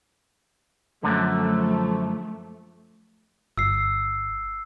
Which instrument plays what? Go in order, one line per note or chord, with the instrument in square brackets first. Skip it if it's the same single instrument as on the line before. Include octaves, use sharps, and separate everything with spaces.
[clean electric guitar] F#2 D3 [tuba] F3 [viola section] A3
[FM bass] G1 [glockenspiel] E6 C7